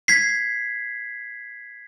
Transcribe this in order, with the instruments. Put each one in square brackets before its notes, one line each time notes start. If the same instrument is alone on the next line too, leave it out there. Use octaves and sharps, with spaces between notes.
[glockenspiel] G#6 B6 C7